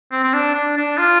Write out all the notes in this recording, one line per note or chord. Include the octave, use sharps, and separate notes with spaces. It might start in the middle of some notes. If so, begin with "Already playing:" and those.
C4
C4
D4
D4
D4
F4